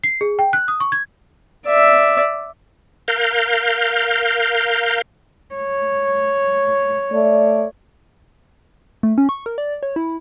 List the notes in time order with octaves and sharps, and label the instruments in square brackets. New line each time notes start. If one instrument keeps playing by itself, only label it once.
[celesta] C7
G#4
G5
F#6
D#6
C#6
G#6
[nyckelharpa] D5 E5
[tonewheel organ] A#4 F5 G6
[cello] C#5
[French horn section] A3 D5
[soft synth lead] A3
C#4
C#6
A#4
D5
C#5
E4